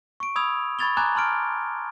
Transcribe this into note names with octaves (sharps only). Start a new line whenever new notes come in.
C#6 D7
B5 D#6 E6 G#6 F7
B5 C#6 G#6 A6 F7 G7
G#5 A#5 B5 D6 F#6 G#6
A5 C6 F6 D7